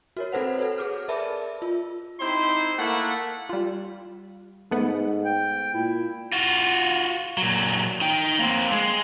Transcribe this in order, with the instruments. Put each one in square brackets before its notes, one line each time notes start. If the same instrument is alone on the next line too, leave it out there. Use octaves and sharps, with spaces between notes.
[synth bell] F#4 A#4 C#5
C4 F#4 A4 B4 C5 F#5
A4 B4 C#5
G#4 D6 F6
A#4 B4 D5 E5 A5 B5
F4
[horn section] C4 D#4 E4 G4 C5 C6
A3 A#3 E4 E5 F#5
[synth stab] G3 F4
[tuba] G#2 [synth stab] A3 B3
[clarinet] G5
[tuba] A#2 [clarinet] E4
[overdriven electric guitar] F4 F#4
A#2 F#3
D#4 G5
A#3 C4
G#3